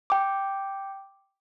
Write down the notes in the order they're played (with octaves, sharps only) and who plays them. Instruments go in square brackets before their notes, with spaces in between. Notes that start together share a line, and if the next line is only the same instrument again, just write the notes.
[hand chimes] G5 D6